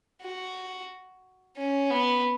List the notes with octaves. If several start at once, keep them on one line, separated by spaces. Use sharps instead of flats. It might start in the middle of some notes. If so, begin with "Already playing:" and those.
F#4
C#4
B3